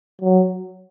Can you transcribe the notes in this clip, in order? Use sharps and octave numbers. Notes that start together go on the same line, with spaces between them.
F#3